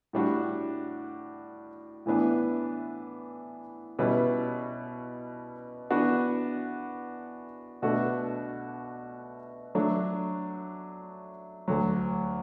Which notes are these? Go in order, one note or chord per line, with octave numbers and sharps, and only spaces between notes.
A2 G3 D4 F#4
A2 E3 B3 D4
B2 G3 C#4 E4 B4
E3 B3 D4 F#4
B2 A3 D4 F#4 A4
F#3 A3 D4
D2 D3 F#3